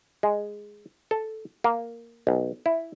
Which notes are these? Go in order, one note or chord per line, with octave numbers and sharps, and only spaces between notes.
G#3
A4
A#3
B1
E4